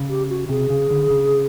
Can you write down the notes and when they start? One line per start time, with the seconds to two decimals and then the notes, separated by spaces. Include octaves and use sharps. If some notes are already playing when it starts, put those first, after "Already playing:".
Already playing: C#3
0.09 G4
0.30 F#4
0.49 C3 G#4
0.70 C#3
0.90 D3
1.10 C#3